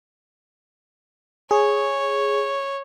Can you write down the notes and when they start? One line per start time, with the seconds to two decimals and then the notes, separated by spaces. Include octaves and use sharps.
1.51 G#4 C#5